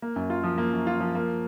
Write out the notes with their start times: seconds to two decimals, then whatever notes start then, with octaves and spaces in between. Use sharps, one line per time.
0.02 A#3
0.16 F#2
0.30 F4
0.44 F3
0.58 A#3
0.73 F#2
0.87 F4
1.00 F3
1.15 A#3